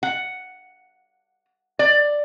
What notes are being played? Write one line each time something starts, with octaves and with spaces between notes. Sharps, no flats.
F#5
D5